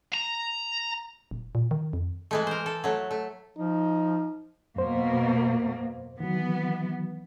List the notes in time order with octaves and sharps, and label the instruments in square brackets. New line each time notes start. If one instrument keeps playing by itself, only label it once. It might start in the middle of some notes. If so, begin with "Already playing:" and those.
[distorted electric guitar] A#5
[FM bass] D#1
A#2
D#3
F2
[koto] E3 G#3 A3
A#4 C5
A4
F#3 A3
A3
[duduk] F3 [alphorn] D#4
[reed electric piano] F#2 C5 [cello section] B2 A#3 B3
[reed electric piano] D#3 F#3 [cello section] E3 B3